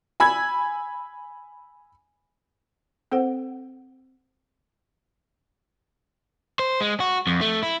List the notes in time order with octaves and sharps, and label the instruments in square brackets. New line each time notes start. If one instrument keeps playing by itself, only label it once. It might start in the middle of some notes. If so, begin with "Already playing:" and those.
[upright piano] G#5 B5 E6 G#6
[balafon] C4 A4 C5 F#5
[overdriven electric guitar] C5
G#3
F#4
F2
A3
E4